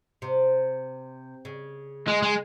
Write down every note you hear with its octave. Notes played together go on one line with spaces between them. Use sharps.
C3
C#3
G#3
G#3